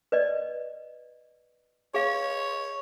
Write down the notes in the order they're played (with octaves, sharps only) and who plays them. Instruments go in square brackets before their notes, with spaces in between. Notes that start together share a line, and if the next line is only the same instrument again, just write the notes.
[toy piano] B4 D5 D#5
[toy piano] G#4 F5 [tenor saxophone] C#5